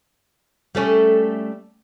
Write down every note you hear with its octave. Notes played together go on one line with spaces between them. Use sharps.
G3 A3 C#4